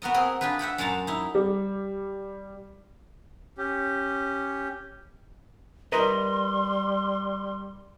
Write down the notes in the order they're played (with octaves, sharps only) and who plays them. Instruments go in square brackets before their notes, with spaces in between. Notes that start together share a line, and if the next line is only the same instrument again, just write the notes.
[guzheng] B3 F#4 A#4 D#5
C4 G#4 A#4 D#5
D4 F4 G4 G#4 B4
E5 F#5 G5 B5
F#2 G#3 F#5 A5 A#5
D#4 E4
[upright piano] G3
[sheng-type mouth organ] C#4 G4
[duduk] G3 [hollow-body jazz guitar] A#4 B4 D#5 [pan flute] C6